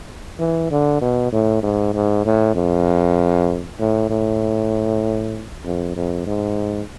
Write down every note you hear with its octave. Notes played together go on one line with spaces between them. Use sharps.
E3
D3
B2
A2
G#2
G#2
A2
F2
A2
A2
F2
F2
G#2